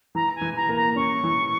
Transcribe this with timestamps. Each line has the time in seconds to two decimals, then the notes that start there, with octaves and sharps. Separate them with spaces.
0.15 E3 A#5
0.35 G#5
0.41 E3
0.56 A#5
0.69 A#3
0.76 A#5
0.96 C#4 C#6
1.24 E3